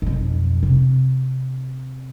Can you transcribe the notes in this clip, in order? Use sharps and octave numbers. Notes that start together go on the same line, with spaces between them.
B1 F2
C3